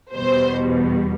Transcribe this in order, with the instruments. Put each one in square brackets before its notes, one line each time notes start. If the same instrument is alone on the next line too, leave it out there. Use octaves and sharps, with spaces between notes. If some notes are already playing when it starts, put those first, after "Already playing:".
[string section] E2 B2 G3 C5